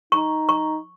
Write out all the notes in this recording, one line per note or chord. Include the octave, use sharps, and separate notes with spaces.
D#4 C#6
C#6